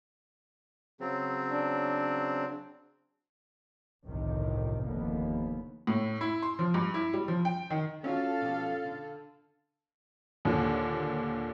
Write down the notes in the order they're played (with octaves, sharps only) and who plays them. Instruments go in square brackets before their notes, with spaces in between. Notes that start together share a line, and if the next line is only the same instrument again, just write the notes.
[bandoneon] C#3 F#3 C4
[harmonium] D4
[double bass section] G1 C2 F2 A2 C3 D#3
F1 D#2 D3 A#3 B3
[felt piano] A2
E4
C6
F3
G2
E4
G3
F3
G5
D#3
[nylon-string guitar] F#3 G3 F#4 [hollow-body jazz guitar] C#4 F4 [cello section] A4 [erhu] F5
[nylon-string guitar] B2 F3 G4
D3
[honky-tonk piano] D#2 A#2 D3